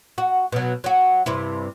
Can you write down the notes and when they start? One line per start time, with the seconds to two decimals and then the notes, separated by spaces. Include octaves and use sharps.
0.18 F#4
0.52 B2 F#3
0.84 F#3 F#4
1.26 G2 C3 E4